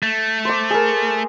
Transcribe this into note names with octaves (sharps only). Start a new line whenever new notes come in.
A3
C5 D6
G#4 A#4